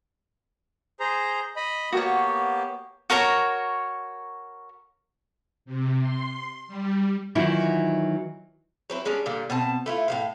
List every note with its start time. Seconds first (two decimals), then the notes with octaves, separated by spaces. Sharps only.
1.00 G#4 C5 A#5
1.56 D#5 B5
1.92 A#3 B3 F#4 G4 C#5
3.10 F#4 A#4 C#5 A#5
5.65 C3
6.00 C6
6.67 G3
7.35 D#3 E3 F#3 E4 F4
8.90 F#3 C4 E4
9.05 G3 G#3 C#4 D4
9.26 A#2 D3 G3
9.50 B2 C4 A5
9.86 A3 E4 F4
10.08 A2 F#3 F5